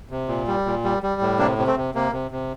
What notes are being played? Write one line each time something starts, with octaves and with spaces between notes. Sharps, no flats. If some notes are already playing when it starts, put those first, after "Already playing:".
C3
A#2
G3
A#2
G3
G3
A2
C3 A#3 D4
C3
A3 C4
C3
C3 A#3
C3
C3